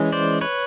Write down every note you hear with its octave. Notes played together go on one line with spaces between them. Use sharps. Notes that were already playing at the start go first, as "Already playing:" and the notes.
Already playing: E3 G#3 C#4
C5 D5
B4 C#5